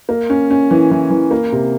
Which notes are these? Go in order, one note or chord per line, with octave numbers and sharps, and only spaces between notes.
A#3
C#4
C#4
E3
E3
E3
A#3
C3